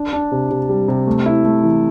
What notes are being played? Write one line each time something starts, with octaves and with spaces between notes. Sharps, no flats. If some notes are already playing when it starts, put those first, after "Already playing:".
Already playing: D4
D4
C3
C3
G3
C3
A3
E4
A3
E3